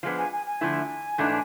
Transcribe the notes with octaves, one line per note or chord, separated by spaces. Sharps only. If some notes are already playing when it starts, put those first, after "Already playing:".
F3 G#3 B3 D4
G#5
G#5
G#5
D3 F3 A3 E4
G#2 E3 A3 D4